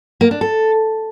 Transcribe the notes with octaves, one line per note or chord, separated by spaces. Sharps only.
A#3
D4
A4